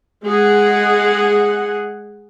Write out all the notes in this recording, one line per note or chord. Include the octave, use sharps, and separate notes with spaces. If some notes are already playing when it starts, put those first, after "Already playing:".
G#3 G#4 F#5